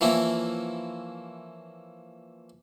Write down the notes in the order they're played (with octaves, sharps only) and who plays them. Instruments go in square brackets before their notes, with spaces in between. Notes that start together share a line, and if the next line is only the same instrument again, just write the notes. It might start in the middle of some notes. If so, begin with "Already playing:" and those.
[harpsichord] E3 F3 A#3 C4 C#4 E4